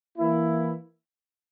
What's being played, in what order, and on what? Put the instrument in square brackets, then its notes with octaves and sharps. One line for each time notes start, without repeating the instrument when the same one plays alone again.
[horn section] E3 A#3 E4